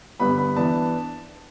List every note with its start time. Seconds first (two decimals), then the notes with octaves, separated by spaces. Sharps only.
0.20 G2 D3 G3 B3 B5
0.38 B5
0.56 E3 B3 D4 A5